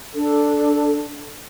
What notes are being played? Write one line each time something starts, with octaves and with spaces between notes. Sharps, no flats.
D4 A4